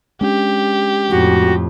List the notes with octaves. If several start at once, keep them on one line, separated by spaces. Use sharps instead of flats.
G#3 C#4 D4 G4
F2 A2 F#4